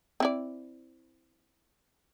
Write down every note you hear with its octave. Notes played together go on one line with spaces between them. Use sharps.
C4 E4 D5